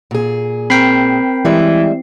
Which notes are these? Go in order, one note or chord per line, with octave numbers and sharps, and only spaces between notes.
A#2 G#4
C4 A#4 G5 B5 C7
E3 G3 G#3 E5